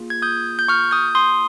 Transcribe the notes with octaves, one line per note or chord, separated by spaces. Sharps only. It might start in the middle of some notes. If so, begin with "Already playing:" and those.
Already playing: A#3 F4 G#4
G#6
D#6 G6
G6
C#6 F6
D#6 G6
C6 D#6